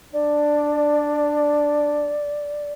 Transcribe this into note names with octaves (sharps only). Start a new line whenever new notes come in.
D4 D5